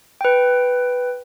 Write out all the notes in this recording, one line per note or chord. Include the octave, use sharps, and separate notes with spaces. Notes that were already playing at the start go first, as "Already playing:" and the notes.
B4 G5